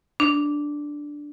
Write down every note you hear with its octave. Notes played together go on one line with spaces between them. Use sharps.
D4